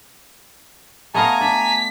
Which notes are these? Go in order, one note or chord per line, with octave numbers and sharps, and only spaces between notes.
A3 B3 D#5 F5 G#5 A#5
D4 B6